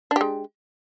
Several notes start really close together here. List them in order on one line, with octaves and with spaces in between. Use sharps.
D4 G4 G#3